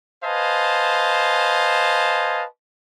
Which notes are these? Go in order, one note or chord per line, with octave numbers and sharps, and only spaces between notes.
B4 C5 D#5 F5 G#5 A5